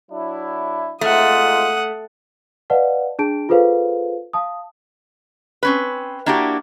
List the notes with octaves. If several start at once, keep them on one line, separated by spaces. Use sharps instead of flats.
F#3 D4 E4
G#2 A3 F4 F#5 D#6
B4 D5 D#5 F5 F#5 A5
D4 G#4 A5 D7
F4 G#4 A4 B4 C5 F5
F5 A5 D#6
C4 C#4 B4
A#3 D4 E4 F#4 G4